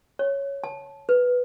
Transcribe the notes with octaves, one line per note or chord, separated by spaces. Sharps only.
C#5
A5
B4